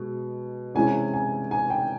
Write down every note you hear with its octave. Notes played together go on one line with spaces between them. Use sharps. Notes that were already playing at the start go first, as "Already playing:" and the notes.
Already playing: B2 G#3
C3 E3 G#3 C#4 E4 G#5
G#5
G#5
G5